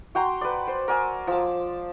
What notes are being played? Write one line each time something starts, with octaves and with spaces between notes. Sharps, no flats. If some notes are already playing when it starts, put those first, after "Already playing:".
F#4 G5 A#5 C6
B4 D5
C5
A#4 D5 G#5 E6
F3 A5